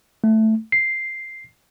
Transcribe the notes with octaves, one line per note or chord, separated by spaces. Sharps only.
A3
C7